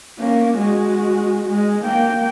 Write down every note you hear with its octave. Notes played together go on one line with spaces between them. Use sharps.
A#3 C#4
G#3 F#4
G#3
A#3 G5